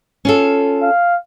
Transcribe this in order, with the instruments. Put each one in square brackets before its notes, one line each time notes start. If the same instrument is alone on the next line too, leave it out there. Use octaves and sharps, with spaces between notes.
[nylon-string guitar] C#4 F4 A4
[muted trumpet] F5